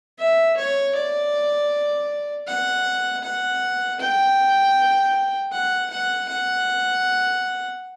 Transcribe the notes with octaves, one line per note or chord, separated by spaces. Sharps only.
E5
C#5
D5
F#5
F#5
G5
F#5
F#5
F#5